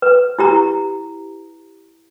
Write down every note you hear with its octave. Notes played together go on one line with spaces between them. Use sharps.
B4
E4 G4 A#5